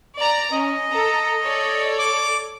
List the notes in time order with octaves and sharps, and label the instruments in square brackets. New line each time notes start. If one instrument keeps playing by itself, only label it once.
[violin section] D5 A#5
[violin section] C#4 [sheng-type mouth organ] D#5
[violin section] A4 A#5
A4 C#5 D5
[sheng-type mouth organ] D6